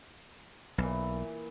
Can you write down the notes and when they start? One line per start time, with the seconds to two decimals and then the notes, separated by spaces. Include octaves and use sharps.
0.78 B1 A#2 E3